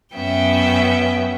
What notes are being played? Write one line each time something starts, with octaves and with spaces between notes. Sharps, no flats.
F#2 B3 C#4 E5 G5